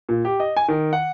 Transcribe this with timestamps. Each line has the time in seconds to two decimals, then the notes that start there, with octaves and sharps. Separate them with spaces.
0.09 A#2
0.25 G4
0.40 D#5
0.57 G#5
0.68 D#3
0.93 F#5